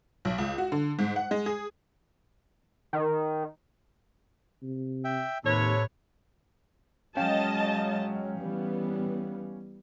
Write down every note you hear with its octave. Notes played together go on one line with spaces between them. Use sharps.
B1
C#2
F#4
D3
G#2
F#5
G#3
G#4
D#3
C3
E5 G5
D#2 A2 C3 A4 B4 C#5
F#3 G#3 C#4 D#5 F5 G5 A5
E3 G3 B3